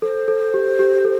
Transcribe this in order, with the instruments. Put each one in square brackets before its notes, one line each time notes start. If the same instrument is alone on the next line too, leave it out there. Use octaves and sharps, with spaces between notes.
[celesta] A4 [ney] C5
[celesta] A4
G4
G4
A4